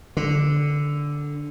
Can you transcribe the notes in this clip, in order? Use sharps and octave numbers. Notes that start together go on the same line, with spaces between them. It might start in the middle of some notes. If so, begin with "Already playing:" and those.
D3